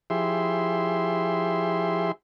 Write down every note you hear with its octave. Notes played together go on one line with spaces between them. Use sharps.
F3 E4 G4 G#4 E5 C6